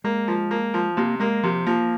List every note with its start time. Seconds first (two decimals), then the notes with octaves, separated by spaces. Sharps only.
0.04 G#3 A#3
0.28 F3
0.51 A#3
0.74 F3
0.97 C3 A#3
1.20 G#3 A#3
1.43 C3 F3
1.66 F3 A#3